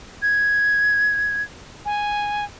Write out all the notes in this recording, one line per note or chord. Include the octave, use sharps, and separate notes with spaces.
G#6
G#5